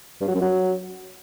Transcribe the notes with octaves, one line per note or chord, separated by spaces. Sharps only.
G2
F#3
F#2
F#3